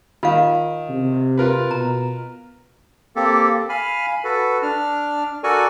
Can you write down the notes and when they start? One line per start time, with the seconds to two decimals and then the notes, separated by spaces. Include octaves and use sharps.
0.23 D#3 F4 F5
0.89 C3
1.38 F4 A#4 B4
1.71 B2 A#5
3.16 A#3 C4 G4 A4
3.69 F5 G#5 B5 F6
4.24 F#4 A4 B4
4.62 D4 F6
5.44 F#4 A4 A#4 D5 G#5 C#6